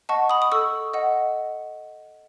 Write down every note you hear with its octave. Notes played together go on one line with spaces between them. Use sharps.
D#5 F#5 A5 C#6
B5 D#6
D#6
A4 C#6 E6
D#5 F#5